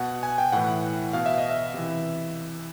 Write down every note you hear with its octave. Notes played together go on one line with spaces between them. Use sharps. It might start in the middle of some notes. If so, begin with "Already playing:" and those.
Already playing: B2 F#5
G#5
G5
A2 E3 F#5
B2 F5
E5
D#5
E5
C3 E3